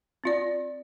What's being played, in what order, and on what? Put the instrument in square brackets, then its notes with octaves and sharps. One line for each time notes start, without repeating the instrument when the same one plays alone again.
[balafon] C4 F4 D5